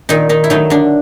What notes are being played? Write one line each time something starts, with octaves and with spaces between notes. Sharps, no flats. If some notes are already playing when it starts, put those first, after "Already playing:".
A#2 D#3 D#4
D#3 D#4
E4
D#3 F#3 A3 D#4
D3 D4